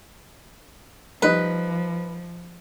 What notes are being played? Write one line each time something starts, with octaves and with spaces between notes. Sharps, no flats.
F3 G3 D#4 B4